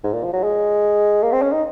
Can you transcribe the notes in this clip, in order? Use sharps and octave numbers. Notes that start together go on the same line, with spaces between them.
G#2
A#2
F3
F#3
G#3
A#3
C4
C#4
D#4